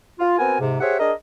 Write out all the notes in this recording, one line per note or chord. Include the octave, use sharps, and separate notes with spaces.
F4
B3 C4 F#4 A#4 G#5
G#2 C3
G4 G#4 C5 C#5 E5 F#5
D4 G#4 A#4 D#5